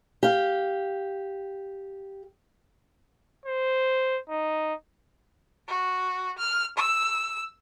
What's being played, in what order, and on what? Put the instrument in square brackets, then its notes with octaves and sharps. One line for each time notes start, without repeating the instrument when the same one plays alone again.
[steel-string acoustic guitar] G4 F5
[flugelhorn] C5
D#4
[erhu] F#4
F6
E6